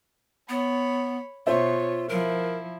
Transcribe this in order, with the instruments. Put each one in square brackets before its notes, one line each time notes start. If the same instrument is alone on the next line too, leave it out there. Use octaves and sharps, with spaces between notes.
[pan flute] B3 [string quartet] C#5 B5
[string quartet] B2 C#5 [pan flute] F4 [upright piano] C5 E5
[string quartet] F3 E4 [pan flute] A#4